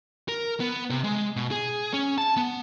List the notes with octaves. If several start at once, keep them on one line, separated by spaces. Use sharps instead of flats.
A#4
B3
C3
G#3
B2
G#4
C#4
A5
B3